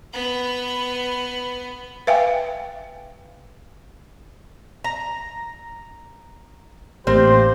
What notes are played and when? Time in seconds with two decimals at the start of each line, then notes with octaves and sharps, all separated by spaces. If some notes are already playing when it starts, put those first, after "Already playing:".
0.13 B3 B4
2.07 B4 E5 F5 G5 G#5
4.84 A#5
7.07 A1 A#3 C4 G4 C5 F5